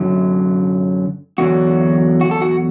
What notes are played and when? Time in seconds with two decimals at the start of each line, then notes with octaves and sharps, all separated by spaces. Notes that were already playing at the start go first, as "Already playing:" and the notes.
Already playing: F#2 D3 F#3
1.38 E2 D3 F#3 F#4
2.21 F#4
2.31 A4
2.41 F#4